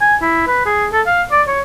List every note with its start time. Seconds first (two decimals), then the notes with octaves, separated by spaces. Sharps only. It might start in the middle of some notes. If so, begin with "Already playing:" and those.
0.01 G#5
0.21 E4
0.47 B4
0.66 G#4
0.92 A4
1.06 F5
1.31 D5
1.47 C#5